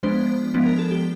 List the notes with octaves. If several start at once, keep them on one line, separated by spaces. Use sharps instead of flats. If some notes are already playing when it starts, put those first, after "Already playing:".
F3 G#3 B3 D4 C5
F3 G#3 B3 D4
A#4
A4
G4